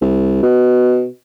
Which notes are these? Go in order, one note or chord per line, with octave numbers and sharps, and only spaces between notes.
C2
B2